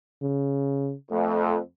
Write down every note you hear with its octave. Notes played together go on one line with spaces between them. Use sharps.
C#3
F2 A3